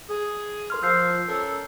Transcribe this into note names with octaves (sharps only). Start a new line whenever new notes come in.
G#4
A#4 C6 F6
F3 E6 G6 C7
C#4 A4 A#4